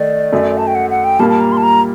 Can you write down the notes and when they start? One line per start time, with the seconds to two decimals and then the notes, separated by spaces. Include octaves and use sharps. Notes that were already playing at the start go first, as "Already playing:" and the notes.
Already playing: D#3 A3 D#4 D5
0.32 F#2 F#3 A3
0.58 A5
0.67 G5
0.75 F#5
0.90 F#5
1.04 G5
1.19 A#2 G3 A#3 A5
1.29 A5
1.40 A#5
1.52 C6
1.57 A5
1.63 A#5